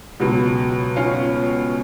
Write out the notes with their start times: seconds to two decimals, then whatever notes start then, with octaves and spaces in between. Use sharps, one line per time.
0.20 C#2 B2 F#3
0.96 C#4 F4